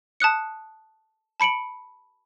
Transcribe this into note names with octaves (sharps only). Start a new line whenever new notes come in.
A5 D#6 F#6 C#7
A5 B5 C#7 D7 F#7